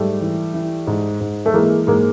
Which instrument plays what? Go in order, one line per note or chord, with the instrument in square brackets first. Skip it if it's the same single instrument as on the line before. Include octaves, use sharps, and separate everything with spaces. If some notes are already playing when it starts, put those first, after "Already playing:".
Already playing: [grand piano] G#2 G3 A3
E3
E3
G#2
G#2
A3
E3 G#3 A#3
G#2 G#3 A#3